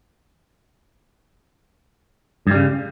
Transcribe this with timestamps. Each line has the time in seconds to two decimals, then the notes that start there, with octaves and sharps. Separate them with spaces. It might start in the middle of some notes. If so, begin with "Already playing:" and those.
2.47 G2
2.51 G3
2.55 C#3